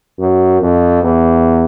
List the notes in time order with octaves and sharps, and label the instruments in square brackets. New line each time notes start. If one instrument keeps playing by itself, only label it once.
[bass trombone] F#2
F2
E2